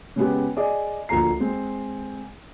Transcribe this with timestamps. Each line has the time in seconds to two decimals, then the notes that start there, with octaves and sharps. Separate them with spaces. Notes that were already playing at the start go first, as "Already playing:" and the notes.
0.16 C#3 G#3 B3 G4
0.57 G#4 D5 D#5
1.09 D2 F3 A#3 A#5 C7
1.40 G#3 C4